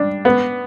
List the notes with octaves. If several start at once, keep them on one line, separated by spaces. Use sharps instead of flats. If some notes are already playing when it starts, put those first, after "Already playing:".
Already playing: G3 D4
B3